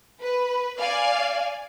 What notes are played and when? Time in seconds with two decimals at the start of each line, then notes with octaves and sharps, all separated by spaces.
0.21 B4
0.79 D5 F5 G#5